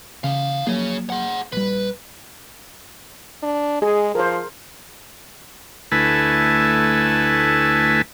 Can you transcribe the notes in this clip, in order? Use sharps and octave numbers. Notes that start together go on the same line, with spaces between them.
C#3 E3 F5
F3 F#3 A#3 G#4 C#5
G#4 F#5
A#1 G3 B4
D4
G#3 G#4
F3 A#4 C5
D2 A3 E4 B4 G#5 A5